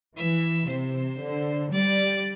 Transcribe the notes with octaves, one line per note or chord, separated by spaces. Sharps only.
E3 E5
C3 C5
D3
G3 D5